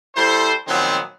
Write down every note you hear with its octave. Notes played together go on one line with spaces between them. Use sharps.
G3 E4 A4 C5
A#2 D#3 F3 F#3 B3 C4